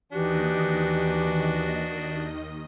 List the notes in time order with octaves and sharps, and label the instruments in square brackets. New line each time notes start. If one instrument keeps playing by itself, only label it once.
[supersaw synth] D#2 D#3 D#5 [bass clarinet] E3 [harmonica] D4 F#4 [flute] G4